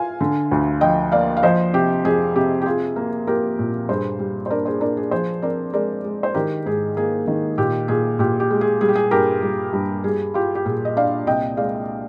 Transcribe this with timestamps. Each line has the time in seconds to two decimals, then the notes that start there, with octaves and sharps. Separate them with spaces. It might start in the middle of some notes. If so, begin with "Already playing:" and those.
Already playing: F4 F5 G#5
0.21 D3
0.51 D2
0.81 F3 D#5 G5
1.12 A#3 D5 F5
1.37 F5
1.43 F3 C5 D#5
1.74 C3 G4
2.04 F2 G#4
2.36 C3 G4
2.62 G4
2.66 F4 G#4
2.96 A#3
3.27 A#3 G4 A#4
3.59 A#2
3.89 G2 G#4 C5
4.19 G3
4.46 C5
4.50 D4 A#4 D5
4.65 G#4 C5
4.81 D4 A#4 D5
4.97 G#4
5.11 F3 G#4 C5
5.42 C4 A#4 D5
5.73 G#3 A#4 D5
6.05 G#3
6.23 C5
6.34 D#3 G4 A#4
6.66 G#2 G#4
6.97 A#3 G#4
7.27 D#3
7.58 A#2 G4
7.88 A#2 G#4
8.19 A#2 G4
8.40 G4
8.51 G#3
8.61 G#4
8.81 G3 G#4
8.89 G4
8.95 G#4
9.11 G2 G4 A#4
9.43 G3
9.73 G2
10.04 G3 G#4
10.34 F4 G4
10.55 G4
10.65 A#2 G#4
10.85 D#5
10.97 D4 D5 F5
11.27 C2 D#5 G5
11.57 G#3 D5 F5